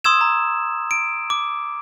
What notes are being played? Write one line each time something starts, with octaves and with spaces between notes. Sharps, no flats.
C6 D#6 E6 G#6 E7
A#5
D7
D6